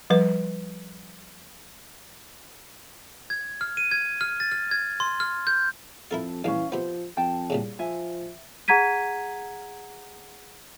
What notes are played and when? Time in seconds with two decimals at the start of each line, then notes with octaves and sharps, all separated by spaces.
0.10 F3 G3 B4
3.30 G#6
3.61 F6
3.77 D#7
3.91 G#6
4.21 F6
4.40 A6
4.51 F6
4.71 G#6
5.00 C6
5.20 F6
5.47 G6
6.11 F2 E4 A4 A#4 F5
6.44 A#1 G2 E3 C#4 F5
6.72 C3 F3 B3 C5
7.17 F2 G5 A5
7.50 C2 A#2 C#3
7.79 F3 E5 G#5
8.68 G#4 F#5 A#5 G#6 B6 D#7